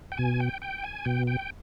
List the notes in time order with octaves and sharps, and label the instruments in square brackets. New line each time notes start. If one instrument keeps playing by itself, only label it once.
[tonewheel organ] G5
B2 G#5
G5
G5
G#5
B2 G5
G5